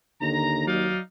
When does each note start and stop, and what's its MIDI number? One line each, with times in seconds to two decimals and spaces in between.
0.22 0.91 39
0.22 0.67 50
0.22 0.66 82
0.67 0.99 54
0.67 1.01 63
0.67 1.01 74
0.67 1.01 77